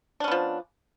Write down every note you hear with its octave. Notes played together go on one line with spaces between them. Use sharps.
F3 B3 C#4 D4